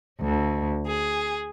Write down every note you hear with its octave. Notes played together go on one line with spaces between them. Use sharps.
D2
G#4